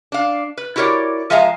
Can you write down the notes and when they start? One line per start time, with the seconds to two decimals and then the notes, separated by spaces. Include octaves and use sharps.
0.12 D4 F5
0.57 B4
0.76 E4 F#4 G4 A#4 C#5 D5
1.30 F3 G#3 E5 F5 G#5 A#5